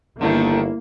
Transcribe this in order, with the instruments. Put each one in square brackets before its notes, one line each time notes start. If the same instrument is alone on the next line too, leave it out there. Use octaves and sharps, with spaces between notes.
[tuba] G1 [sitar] D3 D#3 A3 [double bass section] A#3 [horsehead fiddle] E4